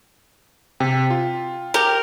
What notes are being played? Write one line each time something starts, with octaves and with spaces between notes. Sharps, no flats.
C3 G5
F4
G4 A#4